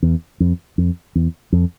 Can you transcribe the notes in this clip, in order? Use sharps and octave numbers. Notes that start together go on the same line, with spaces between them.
E2
F2
F2
E2
F2